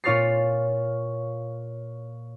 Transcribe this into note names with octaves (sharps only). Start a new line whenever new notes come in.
A#2 F4 C#5 F6 A6 C7